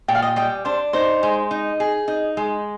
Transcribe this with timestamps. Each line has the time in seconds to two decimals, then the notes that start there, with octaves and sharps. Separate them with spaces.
0.08 A#2 G5
0.15 F5
0.22 D#5 G5
0.36 G3 D#5 G5
0.65 D4 C5
0.93 D#4 C5
1.23 G#3
1.51 D#4
1.80 G#4
2.08 D#4
2.37 G#3